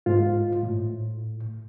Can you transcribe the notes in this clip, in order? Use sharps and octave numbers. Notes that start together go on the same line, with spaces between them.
G#2 F4
A2